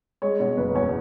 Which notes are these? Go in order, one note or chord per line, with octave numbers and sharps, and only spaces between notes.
G#3 C#5
B2 C#5
F#1 B4
E2 C#5